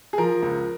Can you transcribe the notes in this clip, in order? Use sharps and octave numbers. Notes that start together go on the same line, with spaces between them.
G#4
F3 A#4
C#2